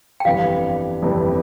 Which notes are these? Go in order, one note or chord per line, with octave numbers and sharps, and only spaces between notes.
G5
G1 F2 E3 G3 F5
G1 F2 E3 G3